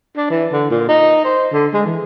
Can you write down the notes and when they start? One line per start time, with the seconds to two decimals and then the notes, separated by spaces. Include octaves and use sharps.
0.17 D4
0.30 E3
0.52 D3
0.71 A#2
0.89 D#4
1.24 C5
1.53 D3
1.74 G#3
1.86 E3